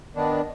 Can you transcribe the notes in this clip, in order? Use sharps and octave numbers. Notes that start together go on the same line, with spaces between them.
D#3 B3 D4